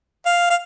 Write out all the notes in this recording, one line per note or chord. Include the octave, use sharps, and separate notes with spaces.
F5
F5